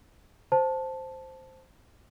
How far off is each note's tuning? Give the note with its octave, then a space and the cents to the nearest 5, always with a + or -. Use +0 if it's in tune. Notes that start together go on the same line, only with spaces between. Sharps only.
C5 +0 A5 +0